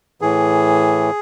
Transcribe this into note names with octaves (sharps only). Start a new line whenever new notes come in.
A2 E3 G#4